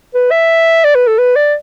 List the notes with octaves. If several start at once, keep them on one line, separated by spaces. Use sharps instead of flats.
B4
E5
D5
B4
A4
B4
D5